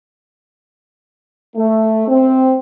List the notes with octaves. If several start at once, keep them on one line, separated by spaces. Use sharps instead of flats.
A3
C4